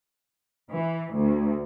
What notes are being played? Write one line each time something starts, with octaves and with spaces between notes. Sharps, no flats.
E3
D2